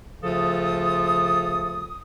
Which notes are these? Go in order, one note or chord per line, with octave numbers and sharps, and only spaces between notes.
D2 C#3 F3 F4 A4 D#6